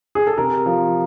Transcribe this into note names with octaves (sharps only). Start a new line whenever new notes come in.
G#4
A4
C3 A#4
F3